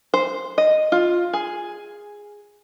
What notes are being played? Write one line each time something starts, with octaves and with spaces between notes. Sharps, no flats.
C5
D#5
F4
G#4